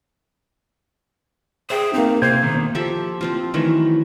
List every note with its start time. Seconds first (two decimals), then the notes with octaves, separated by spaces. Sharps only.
1.70 G#4 C5 E5 G5
1.94 A#3 C4 D#4
2.22 C3 A#3 F4 C5 G6 G#6
2.42 B2 D#3 A3
2.75 F3 G4 A4 E5
3.21 F3 C4 F4
3.54 D#3 E3 F#3 A3